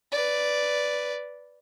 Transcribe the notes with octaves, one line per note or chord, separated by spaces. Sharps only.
B4 D5